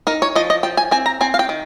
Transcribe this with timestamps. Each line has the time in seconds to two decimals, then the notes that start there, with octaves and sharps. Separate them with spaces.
0.07 D#4 A#4
0.22 C#5
0.35 F3 D#5
0.50 D#5
0.63 F3 G5
0.77 G#5
0.91 C4 G#5
1.06 A#5
1.21 C4 G#5
1.34 F5
1.39 G5
1.49 D#3